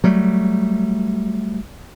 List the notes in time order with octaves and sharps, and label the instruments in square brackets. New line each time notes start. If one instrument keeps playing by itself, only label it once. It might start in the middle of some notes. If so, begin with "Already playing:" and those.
[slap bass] F#3 G3 A3